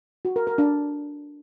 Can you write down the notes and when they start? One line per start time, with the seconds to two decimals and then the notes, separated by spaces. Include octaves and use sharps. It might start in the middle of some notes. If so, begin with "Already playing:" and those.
0.25 F#4
0.36 A#4
0.47 A#4
0.58 D4